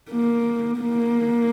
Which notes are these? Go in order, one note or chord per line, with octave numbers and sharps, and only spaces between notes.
A#3
A#3